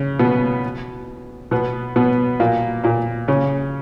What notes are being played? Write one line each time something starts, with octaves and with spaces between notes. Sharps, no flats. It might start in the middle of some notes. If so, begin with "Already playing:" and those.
Already playing: C#3
B2 B3
B2 B3
B2 B3
A#2 A#3
A#2 A#3
C#3 C#4